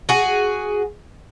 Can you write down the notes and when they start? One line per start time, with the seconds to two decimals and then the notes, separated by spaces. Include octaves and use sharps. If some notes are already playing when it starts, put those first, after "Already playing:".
0.09 F#4 G#4